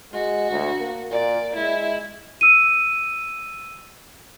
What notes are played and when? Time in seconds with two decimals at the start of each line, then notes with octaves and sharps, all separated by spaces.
0.13 G#3 F#4
0.52 D2
0.80 A#3
1.11 A#2 D5
1.56 G#3 E4
2.41 E6 D#7